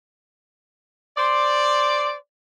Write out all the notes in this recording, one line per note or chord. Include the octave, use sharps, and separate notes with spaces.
C5 D5